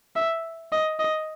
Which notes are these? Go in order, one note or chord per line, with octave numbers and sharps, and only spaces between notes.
E5
D#5
D#5